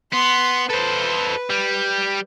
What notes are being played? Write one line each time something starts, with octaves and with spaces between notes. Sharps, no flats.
B3 C6
A4 B4 C5
G3